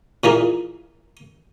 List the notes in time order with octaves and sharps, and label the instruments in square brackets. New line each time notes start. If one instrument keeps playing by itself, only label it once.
[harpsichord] A#2 E3 A#3 G#4